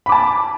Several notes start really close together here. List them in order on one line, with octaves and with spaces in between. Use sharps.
B5 D6 A5